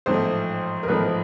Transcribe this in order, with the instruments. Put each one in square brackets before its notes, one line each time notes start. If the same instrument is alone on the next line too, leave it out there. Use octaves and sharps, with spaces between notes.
[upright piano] A1 G#2 F3 A3 C5
A#4
A1 G#2 F3 A3 B4